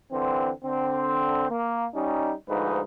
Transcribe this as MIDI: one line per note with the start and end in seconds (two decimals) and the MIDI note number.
0.12 0.50 50
0.12 0.50 52
0.12 0.50 60
0.65 1.45 50
0.65 1.45 60
1.50 1.86 58
1.95 2.33 55
1.95 2.33 61
1.95 2.33 63
2.49 2.82 38
2.49 2.82 44
2.49 2.82 53
2.49 2.82 63
2.49 2.82 71